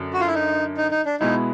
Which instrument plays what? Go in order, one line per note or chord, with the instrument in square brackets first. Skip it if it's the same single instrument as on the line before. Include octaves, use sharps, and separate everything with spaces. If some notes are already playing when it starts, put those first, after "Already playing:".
Already playing: [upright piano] F#2 D3 F#3
[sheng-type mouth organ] F#4
F4
E4
D#4
D#4
D#4
D4
[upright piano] B2 G#3 B3 E4 [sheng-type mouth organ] D#4